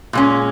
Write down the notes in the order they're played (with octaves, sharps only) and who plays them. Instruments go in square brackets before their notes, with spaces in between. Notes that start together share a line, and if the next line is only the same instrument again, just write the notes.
[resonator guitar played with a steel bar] A#2 G#3 C#4